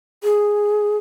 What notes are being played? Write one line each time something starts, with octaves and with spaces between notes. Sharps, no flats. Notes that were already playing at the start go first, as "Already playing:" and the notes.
G#4